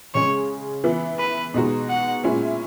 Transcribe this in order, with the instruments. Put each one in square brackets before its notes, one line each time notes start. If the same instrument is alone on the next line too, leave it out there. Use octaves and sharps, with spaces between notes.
[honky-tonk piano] C#3 G#3 C#4 [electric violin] C#5
[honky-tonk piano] E3 B3 E4
[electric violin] B4
[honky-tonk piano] B2 G#3 D#4 F#4
[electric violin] F#5
[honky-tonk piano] A#2 G#3 C#4 E4